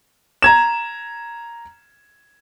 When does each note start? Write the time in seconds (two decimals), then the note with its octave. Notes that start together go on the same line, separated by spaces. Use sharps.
0.42 A#5 G#6 E7